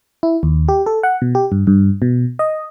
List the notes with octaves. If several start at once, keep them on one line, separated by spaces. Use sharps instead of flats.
E4
D#2
G4
A4
F#5
B2
G4
G2
G2
B2
D#5